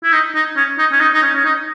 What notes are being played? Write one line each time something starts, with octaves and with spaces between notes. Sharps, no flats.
E4
D#4
D#4
C#4
D#4
C#4
D#4
D#4
C#4
C#4
D#4